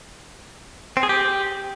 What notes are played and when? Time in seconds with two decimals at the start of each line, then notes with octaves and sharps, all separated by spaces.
0.97 C4
1.03 G#4
1.09 G4